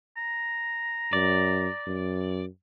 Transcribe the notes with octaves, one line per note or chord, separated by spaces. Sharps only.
A#5
F#2 D5
F#2